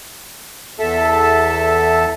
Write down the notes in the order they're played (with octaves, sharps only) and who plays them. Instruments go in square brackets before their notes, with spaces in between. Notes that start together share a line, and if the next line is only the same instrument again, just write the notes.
[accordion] E2 A4 E5 A5